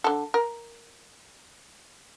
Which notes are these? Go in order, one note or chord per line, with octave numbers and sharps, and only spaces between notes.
D3 A4
A#4